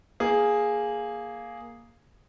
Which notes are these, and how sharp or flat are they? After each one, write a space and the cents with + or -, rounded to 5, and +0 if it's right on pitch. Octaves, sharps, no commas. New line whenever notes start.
A#3 +0 G#4 +0